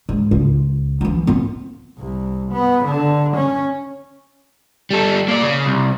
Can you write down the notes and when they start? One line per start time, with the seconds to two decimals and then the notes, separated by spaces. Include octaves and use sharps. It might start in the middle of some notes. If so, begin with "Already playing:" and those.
0.09 G#2
0.31 C#2
1.01 E3 F3
1.27 B3 C4
1.99 C2
2.52 B3
2.85 D3
3.37 C#4
4.91 G3 A4
5.29 A#3 D5
5.43 C#3
5.66 C2